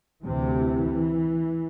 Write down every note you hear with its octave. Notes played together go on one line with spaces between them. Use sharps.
D2 C3 E3